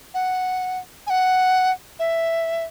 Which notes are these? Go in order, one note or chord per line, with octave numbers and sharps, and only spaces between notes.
F#5
G#5
F#5
E5